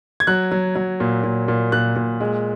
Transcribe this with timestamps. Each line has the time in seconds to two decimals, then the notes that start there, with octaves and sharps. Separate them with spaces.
0.20 G#6
0.27 F#3 F#6
0.51 F#3
0.75 F#3
1.00 A#2
1.24 A#2
1.48 A#2
1.72 A#2 F#6
1.96 A#2
2.20 G#3